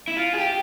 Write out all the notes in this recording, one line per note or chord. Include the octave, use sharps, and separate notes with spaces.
E4
F4
G#4
G4